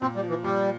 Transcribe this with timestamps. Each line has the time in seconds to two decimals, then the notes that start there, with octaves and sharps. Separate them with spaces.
0.02 A#2 C4
0.16 G3
0.23 F3
0.30 E3
0.44 A#2 G3